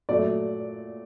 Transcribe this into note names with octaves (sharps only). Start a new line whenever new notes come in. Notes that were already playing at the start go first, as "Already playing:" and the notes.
A#2 F#3 A3 D5